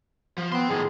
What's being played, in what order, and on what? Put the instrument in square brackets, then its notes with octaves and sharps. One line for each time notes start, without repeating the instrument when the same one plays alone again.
[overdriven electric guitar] F3
[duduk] B3 [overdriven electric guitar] G5 C6
[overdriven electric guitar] A2 D#3 [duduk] G#4